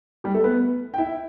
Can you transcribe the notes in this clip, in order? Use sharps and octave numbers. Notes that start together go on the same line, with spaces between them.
G3 G4
A3 A4
B3 B4
G5
E4 E5